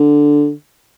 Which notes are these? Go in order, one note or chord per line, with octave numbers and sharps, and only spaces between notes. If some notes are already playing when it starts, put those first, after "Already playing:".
Already playing: D3